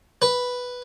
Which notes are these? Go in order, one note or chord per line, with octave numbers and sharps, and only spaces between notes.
B4